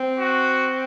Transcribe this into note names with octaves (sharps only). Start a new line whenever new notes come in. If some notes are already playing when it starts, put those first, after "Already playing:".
Already playing: C4
F#4